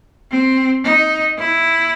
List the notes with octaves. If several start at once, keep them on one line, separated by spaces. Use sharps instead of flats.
C4
D#4
E4